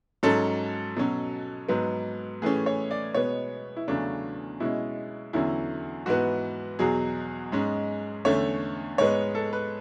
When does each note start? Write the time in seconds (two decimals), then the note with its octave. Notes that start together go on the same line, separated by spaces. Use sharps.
0.23 G#2 F#3 C#4 A4
0.96 B2 F#3 C#4
1.69 G#2 F#3 B3
2.42 A2 E3 A3 C#4 G#4
2.66 C#5
2.91 D5
3.14 B2 G#3 B3 C#5
3.76 E4
3.88 E2 C#3 F#3 A3 C#4 D4
4.60 B2 G#3 C#4 E4
5.33 E2 D3 F#3 C#4 E4
6.06 G#2 E3 B3 F#4
6.79 E2 B2 F#3 G#4
7.52 G#2 G#3 C#4
8.25 E2 D3 A3 C#4 C#5
8.98 G#2 G#3 B3 C#5
9.35 A4
9.53 B4